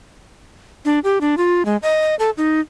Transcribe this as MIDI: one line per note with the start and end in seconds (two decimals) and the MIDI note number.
0.85 0.99 62
1.04 1.18 67
1.21 1.35 62
1.38 1.65 65
1.65 1.77 56
1.83 2.15 75
2.19 2.30 69
2.37 2.60 63